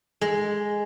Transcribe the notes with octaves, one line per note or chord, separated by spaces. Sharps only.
G#3